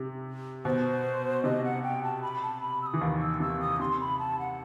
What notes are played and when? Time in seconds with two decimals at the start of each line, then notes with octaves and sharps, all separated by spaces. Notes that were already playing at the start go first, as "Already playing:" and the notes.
Already playing: C3
0.65 B2 C5
1.44 C3 D#5
1.64 F#5
1.83 G5
2.03 A5
2.23 B5
2.42 A5
2.62 B5
2.82 E6
2.86 D#6
2.94 E3
3.01 D#2 D#3
3.22 E6
3.40 C3 E6
3.60 D#6
3.80 C3 C6
4.00 B5
4.19 A5
4.40 F#5